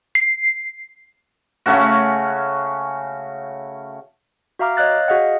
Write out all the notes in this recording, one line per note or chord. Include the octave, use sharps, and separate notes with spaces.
C7
C#3 A3 C#4 F#4
F#4 E5 F5 A#5 D6 F6
C#5 D#5 F5 F#6 A6
F#4 G#4 D#5 F5 F#5